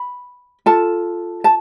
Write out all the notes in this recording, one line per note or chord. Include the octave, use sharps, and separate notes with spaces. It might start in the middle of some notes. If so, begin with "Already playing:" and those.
Already playing: B5
F4 A4 A5
A5